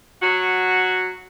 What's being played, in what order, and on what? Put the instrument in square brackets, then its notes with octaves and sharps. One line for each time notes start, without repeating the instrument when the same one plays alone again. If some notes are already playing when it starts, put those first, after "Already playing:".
[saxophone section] F#3 F#4